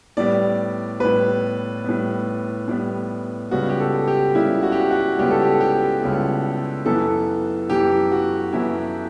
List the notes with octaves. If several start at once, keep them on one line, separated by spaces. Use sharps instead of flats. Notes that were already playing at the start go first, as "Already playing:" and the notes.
A2 G3 B3 D5
A2 G3 B3 B4
A2 G3 B3
A2 G3 B3
C#2 C#3 G3 B3 F#4
G4
A4
G4
C#2 C#3 G3 B3 E4
F#4
G4
F#4
F#4
C#2 C#3 G3 B3 G4
A4
G4
G4
C#2 C#3 G3 B3
F#2 E3 B3 A4
F#2 E3 B3 G4
F#4
F#2 E3 B3 E4